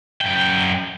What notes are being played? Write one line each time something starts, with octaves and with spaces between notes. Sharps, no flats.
F#2 G5